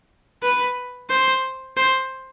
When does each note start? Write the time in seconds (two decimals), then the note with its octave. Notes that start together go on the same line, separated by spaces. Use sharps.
0.43 B4
1.10 C5
1.77 C5